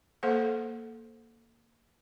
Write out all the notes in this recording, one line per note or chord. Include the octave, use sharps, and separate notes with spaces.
A#3 A4 C5 F#5